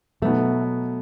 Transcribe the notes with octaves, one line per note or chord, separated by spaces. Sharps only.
B2 F#3 A3 B3 D#4